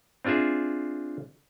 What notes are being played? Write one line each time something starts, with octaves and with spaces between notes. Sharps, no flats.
C4 D4 F4 G#4 E5